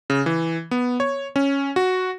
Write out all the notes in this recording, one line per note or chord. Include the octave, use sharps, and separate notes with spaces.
C#3
E3
B3
C#5
C#4
F#4